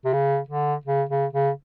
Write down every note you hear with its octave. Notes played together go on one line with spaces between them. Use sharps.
C3
C#3
D3
C#3
C#3
C#3